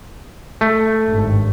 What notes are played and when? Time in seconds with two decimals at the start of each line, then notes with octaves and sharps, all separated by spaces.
0.61 A3
1.05 G#1 G2